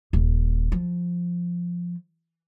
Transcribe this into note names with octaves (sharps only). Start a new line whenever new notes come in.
D#1
F3